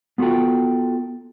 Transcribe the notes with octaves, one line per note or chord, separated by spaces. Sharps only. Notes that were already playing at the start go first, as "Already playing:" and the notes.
B3 F4 F#4 A4 G5